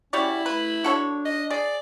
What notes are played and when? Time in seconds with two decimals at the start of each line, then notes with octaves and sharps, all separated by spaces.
0.13 G3 C#4 E4 F#4 D5
0.46 A3 B4
0.84 D4 F#4 A4 C#5
1.25 D#5
1.50 G#4 D5